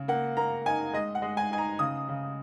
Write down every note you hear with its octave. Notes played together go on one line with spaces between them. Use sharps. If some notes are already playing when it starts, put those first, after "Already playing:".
Already playing: C#3
A#3 F#5
A#3 A#5
D#4 G#5
G#3 D#5
F#5
G#3
G#5
D#4 G#5
A#5
C#3 D#6
C#3